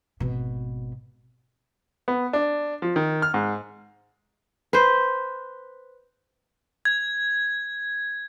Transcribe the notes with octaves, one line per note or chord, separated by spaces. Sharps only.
G#1 B2
B3
D4
F3
D#3
F6
G#2
B4 C5
G#6